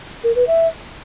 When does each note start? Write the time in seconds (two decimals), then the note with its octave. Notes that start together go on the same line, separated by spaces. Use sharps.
0.23 A#4
0.35 B4
0.47 E5